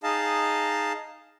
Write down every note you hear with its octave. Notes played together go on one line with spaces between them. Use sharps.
D#4 G#4 D#5 F5 A5